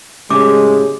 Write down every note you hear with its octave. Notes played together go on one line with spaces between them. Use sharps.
A2 C#3 G#3 G4 G#4 C#5 D6